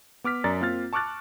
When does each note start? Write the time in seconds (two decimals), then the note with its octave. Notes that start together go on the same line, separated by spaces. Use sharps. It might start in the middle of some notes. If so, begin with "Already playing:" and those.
0.24 B3 D6 F6 B6
0.44 F#2 D5 A#5 A6
0.61 A#3 C4 F4 F6 A6
0.93 A5 C#6 D6 F6 F#6 A6